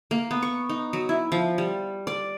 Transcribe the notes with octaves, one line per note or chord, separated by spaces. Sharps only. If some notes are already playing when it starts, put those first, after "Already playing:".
A#3
B3
C#6
D#4
F#3
E4
F3
G3
D5